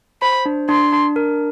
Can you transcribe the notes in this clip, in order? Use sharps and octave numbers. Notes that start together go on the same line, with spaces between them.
C5 B5
D4
D4 C6
D4
A#4